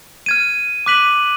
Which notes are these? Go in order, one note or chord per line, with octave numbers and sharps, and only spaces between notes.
F6 G#6 D#7
D6 F#6 B6 D#7 F#7